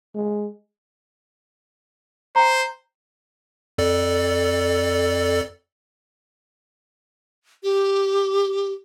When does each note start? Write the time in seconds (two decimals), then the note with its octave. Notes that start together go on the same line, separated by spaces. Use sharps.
0.15 G#3
2.36 C5 G5 A#5
3.78 F2 A4 D5
7.63 G4